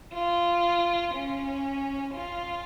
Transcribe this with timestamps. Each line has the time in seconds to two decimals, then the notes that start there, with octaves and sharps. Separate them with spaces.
0.13 F4
1.14 C#4
2.14 F4